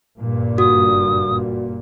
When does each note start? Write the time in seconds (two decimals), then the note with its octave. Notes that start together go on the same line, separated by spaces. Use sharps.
0.19 F#1 G2 A#2
0.58 F#4 D#6